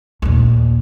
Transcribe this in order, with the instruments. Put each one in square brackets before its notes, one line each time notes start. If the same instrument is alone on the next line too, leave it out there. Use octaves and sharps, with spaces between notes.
[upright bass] D#2 A#2